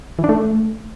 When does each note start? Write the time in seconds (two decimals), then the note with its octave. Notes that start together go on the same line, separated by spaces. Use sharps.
0.19 E3
0.24 D4
0.29 A3